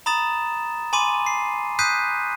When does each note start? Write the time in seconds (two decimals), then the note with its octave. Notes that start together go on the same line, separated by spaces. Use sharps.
0.06 A#5 B5 D#6 A6 E7
0.93 G#5 B5 C6 D6 D#7
1.26 C7
1.79 D#6 F#6 G6 B6 C7 D#7